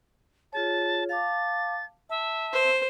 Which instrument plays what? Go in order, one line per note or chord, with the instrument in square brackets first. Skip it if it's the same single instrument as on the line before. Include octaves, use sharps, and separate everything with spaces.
[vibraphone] F4 G#4 C#5 [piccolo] A5
[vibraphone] F5 A5 D6 [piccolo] A6
[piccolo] E5 [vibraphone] A5
[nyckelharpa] C5